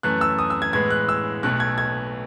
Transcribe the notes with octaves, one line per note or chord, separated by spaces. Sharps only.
F#2 E3 A3 F#6
E6
D#6
E6
G#6
A2 E3 G#3 B3 G#6
F#6
E6
B1 B2 A3 F#6
G#6
G#6